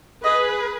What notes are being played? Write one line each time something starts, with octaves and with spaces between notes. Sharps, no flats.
G#4 B4 D#5